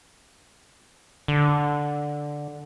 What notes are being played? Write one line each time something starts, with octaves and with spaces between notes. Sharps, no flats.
D3